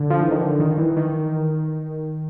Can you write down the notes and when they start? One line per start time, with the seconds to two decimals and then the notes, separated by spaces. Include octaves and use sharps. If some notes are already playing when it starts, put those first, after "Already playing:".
Already playing: D3
0.10 F3
0.21 E3
0.31 D#3
0.42 D3
0.60 D#3
0.78 E3
0.97 D#3